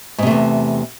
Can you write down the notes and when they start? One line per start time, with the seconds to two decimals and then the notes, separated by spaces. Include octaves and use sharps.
0.18 G#2
0.23 C3
0.27 A3
0.31 E2